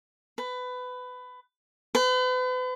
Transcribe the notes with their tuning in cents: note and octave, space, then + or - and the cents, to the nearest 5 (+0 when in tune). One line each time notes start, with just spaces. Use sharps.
B4 +20
B4 +40